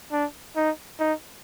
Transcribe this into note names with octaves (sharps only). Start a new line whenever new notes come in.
D4
D#4
D#4